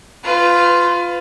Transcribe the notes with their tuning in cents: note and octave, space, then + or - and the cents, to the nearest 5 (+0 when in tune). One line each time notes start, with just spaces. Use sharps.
F4 +0 B4 +35